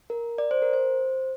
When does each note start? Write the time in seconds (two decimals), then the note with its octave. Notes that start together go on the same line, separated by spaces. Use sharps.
0.10 A#4
0.38 D5
0.51 C5
0.62 A#4
0.73 C5